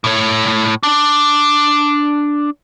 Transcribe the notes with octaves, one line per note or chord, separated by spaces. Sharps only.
A2 C#5
D4 A5